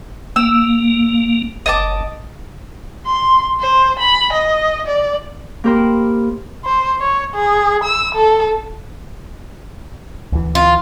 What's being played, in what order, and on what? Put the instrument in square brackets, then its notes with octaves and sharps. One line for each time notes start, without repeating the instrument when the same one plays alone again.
[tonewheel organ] A#3 [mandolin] E6
[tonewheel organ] F#1 [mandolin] D#5 A5 D6
[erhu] C6
C5
B5
D#5
D5
[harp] A#3 G4 A#4 C5 B5
[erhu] C5
C#5
G#4
E6
A4
[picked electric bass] D2 E3
[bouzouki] F4